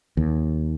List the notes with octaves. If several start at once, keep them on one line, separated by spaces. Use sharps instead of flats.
D#2